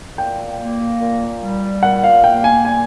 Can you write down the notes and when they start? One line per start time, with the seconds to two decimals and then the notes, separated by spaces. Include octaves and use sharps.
0.18 A#2 G5
0.59 A#3
1.01 A#2
1.42 G3
1.83 A#2 F#5
2.04 F5
2.24 A#3 G5
2.44 G#5
2.65 A#2 G#5